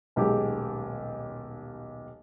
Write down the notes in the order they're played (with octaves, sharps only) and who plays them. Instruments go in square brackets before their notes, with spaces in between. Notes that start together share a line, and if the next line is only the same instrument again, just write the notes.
[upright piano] D#1 B1 G#3 G4 G#4